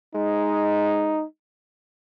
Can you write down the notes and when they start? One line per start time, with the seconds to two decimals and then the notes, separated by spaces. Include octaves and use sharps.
0.15 G#3 D#4